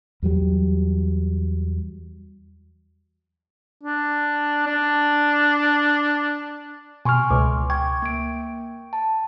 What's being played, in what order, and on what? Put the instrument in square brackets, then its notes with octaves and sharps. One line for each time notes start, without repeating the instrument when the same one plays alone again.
[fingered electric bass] E2 F#3 G3
[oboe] D4
D4
[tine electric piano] B2 F6 [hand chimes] G#5 C6 C#6
[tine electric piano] C#2 [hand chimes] D6
[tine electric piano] G5 [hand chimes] C#6 G#6
[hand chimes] A#3 D7
A5